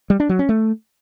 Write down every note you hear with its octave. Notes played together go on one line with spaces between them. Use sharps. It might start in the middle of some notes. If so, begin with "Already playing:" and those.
G3
D4
F#3
C#4
A3